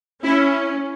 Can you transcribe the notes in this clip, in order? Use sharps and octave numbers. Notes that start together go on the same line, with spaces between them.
C#4 E4